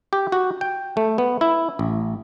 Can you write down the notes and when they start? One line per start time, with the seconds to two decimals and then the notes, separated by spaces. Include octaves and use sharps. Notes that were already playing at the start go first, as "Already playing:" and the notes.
0.13 G4
0.32 F#4
0.61 G5
0.97 A3
1.18 B3
1.41 E4
1.79 A1